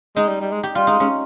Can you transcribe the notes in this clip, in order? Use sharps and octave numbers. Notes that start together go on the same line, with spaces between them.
G#3 D#4
G3
G3
G#3
G4
G3 F4
G#3 D#4
G#3 C#4